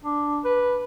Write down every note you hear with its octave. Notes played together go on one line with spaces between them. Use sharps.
D4
B4